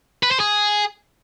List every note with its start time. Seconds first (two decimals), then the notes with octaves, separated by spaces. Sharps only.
0.23 B4
0.31 C5
0.40 G#4